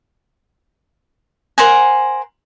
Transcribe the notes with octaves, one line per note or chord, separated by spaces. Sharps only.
A#4 C5 F#5 G#5